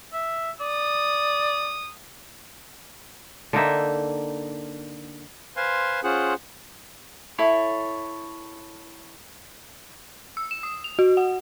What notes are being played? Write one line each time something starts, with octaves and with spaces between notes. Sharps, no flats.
E5
D5 D#6
D3 A#3 D#4 E5
B4 C5 F5 G#5 C6
C#4 F4 G#4 C5 F#5
E4 A4 C#5
E6
E7
D#6
F7
F#4
F#5